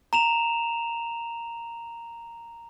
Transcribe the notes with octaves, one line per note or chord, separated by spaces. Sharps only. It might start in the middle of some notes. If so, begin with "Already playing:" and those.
A#5 E7 F7